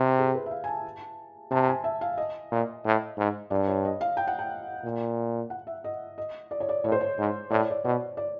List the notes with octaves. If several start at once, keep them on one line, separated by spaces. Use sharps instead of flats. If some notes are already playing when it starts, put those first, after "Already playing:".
Already playing: C3 G4
G#4
B4
E5
F5
G#5
A5
C3 A5
G#5
E5
F5
D#5
A#2
A2
G#2
G2 D5
C#5
D#5
F5
G5
F#5
G5
A#2
F#5
E5
D#5
D#5
D5
C#5
D5
A2 C#5
C5
C#5
G#2
A2 D5
C#5
D5
B2 D5
D5